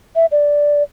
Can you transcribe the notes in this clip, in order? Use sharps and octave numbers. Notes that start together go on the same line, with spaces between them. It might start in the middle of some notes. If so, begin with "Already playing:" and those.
E5
D5